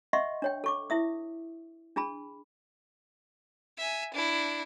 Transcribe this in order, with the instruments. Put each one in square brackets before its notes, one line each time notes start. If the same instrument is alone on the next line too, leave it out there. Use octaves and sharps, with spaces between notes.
[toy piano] D#5 E5 F#5 C6 C#6
D4 C#5 G5
A4 C#6 D6
E4 E5 D#6
D4 G#4 A5 B5
[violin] E5 G#5
D4 E4